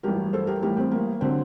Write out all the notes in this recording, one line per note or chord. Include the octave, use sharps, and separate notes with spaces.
A1 G2 F#3 G4 A#4
A4 C5
G4 A#4
A1 A2 G3 G4 A#4
C4
A#3
D3 F#3 C4